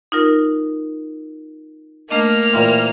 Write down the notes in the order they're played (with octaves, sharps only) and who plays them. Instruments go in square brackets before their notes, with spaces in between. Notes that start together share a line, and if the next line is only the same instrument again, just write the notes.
[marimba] D#4 F4 A#4
[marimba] A3 D4 D#5 [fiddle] A#3 F6
[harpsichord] A#2 E3 C4